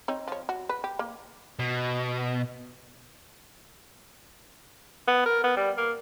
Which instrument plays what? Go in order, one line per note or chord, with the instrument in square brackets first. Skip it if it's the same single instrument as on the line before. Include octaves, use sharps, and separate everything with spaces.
[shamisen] C4 D#4 C#5
F3 C#5
F#4
B4
G4
A#3
[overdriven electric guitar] B2
[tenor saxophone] B3
A#4
B3
G3
A#3